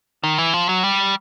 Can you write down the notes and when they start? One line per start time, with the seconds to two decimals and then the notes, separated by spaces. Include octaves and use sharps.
0.24 D#3
0.38 E3
0.54 F3
0.69 F#3
0.84 G3